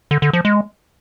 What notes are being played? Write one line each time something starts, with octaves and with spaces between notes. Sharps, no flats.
D3
D3
F3
G#3